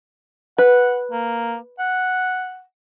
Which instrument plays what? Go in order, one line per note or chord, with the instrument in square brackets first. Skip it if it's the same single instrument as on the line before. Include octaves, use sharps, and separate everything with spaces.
[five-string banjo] B4 [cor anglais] F#5
[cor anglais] A#3
F#5